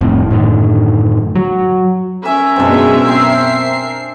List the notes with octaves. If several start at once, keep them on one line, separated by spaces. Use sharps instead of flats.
F1 F2 A2
F#2 A2 D3 D#3
F#3
C#4 A#4 E5 G#5
F#2 B2 G#3 C4 D4
C4 E6 C7